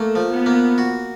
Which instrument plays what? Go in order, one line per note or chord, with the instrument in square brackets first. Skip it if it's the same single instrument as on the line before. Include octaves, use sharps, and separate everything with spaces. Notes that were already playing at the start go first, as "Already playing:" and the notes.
Already playing: [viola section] A3 [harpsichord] A#3
[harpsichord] F3
[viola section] B3
[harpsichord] A#3
F#4